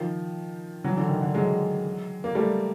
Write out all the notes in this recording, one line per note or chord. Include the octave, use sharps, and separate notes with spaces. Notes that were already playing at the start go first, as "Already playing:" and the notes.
Already playing: D#3 F3
E3 F#3
D3 E3
D#3
D3
F#3 G#3
A#3
G3 A3